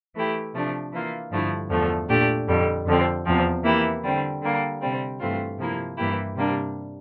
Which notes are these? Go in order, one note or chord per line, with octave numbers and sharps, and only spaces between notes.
E3 A3 E4 G4
C3 F3 A3 D4
E3 A#3 F4
G2 D3 F3 A3 E4
E2 D3 F3 A3
A#2 A3 D4 G4
F2 D3 G3
F2 D3 F3 C4
E2 C3 F3 C4
E3 A#3 E4 G4
D3 G3 C4
D3 G3 A#3
C3 G3 C4
G2 E3 A3 C4 F4
C3 F3 A#3 E4
G2 E3 A#3 E4 G4
C3 G3 A#3 D4